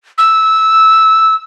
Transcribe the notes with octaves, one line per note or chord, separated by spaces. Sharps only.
E6